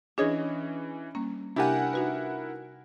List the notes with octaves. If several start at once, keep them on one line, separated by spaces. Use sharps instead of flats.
E3 C#4 D4 G#4 C#5 D#5
G3 A#3 C#4
C3 D4 E4 G4 A#4 F#5 G#5
D#4 F#4 B4